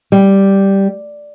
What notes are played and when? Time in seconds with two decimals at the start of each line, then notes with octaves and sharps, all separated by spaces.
0.12 G3